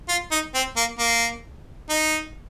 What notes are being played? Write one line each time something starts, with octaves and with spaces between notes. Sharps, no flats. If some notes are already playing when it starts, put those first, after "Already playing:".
F4
D#4
C4
A#3
A#3
D#4